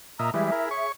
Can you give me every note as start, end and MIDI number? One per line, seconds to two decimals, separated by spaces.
0.19 0.30 46
0.19 0.30 75
0.19 0.30 76
0.19 0.32 82
0.34 0.51 52
0.34 0.51 55
0.34 0.51 56
0.34 0.86 68
0.34 0.86 76
0.52 0.69 64
0.52 0.69 70
0.71 0.92 73
0.71 0.92 85